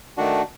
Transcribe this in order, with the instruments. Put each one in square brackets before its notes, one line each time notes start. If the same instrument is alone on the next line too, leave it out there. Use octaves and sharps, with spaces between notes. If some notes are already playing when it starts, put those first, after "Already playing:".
[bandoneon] D#3 A3 D4 F#4